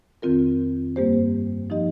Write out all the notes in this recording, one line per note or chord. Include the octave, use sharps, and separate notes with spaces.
F2 D#3 C4 F4 A#4
G2 G3 A#3 G4 C5
F3 D#4 G4 D#5